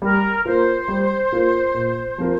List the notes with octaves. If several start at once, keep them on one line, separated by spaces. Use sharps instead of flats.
G3 A#4
A#3 F4 A#4 C5
G3
A#3 F4 A#4
A#2
F3 C4 F4 A#4